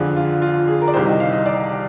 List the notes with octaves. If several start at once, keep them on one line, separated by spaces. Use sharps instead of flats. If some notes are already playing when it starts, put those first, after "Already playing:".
Already playing: F2 D3 F3 G#4
F4
F4
G#4
A#4
D5
C2 C3 D#3 C5
D#5
F5
D#5
D5